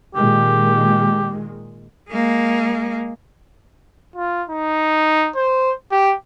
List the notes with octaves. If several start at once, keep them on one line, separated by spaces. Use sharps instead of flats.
A#2 D#3 G#3 G4
G#3 A#3
F4
D#4
C5
G4